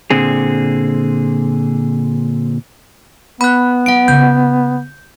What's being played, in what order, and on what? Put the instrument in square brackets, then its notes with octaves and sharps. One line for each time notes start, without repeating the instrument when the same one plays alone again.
[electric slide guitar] A#2 D3 C4 G#4
[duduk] B3 [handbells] B5 F#6
[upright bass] F#3 [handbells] F#5 D7
[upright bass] C#3 A#3 [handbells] G6